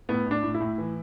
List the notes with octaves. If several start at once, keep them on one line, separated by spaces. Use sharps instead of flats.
A2 B3
A2 D4
A2
E4
A2
E3